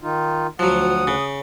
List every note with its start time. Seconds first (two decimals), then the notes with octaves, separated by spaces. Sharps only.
0.02 D#3 D#4 F4
0.59 D2 F3 F#3 F#5 D#6
1.07 C#3